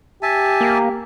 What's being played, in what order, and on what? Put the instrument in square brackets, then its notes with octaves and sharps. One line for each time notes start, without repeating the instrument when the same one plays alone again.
[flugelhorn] G4 [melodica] E5 G#5 A5
[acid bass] A#3